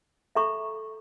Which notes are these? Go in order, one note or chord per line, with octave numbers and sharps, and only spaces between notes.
A4 E5 A#5 C#6